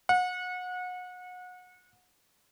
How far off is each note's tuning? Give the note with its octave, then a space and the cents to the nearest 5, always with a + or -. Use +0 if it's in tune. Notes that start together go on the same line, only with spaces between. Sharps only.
F#5 -30